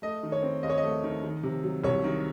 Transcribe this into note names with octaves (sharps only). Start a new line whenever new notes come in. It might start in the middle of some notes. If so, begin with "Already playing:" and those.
A3 D#5
D#3
C#5
C4
D#2 D#5
C#5
D#5
A3
D#3
D#3
C3
F#3
C2 C#5
D#3